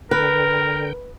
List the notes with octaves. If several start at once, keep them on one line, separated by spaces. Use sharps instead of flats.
D3 A#4 B4 G5